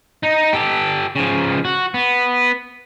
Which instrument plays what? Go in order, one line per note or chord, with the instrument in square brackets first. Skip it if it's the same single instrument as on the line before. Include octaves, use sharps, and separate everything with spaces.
[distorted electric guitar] D#4
G4 A4
C#3 F3
F#4
B3